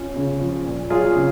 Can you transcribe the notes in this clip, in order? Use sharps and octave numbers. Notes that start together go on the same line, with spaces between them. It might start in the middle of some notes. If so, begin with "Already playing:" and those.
Already playing: C#4 F4
C#3
F3
A#2
F#3 F4 G#4
C#3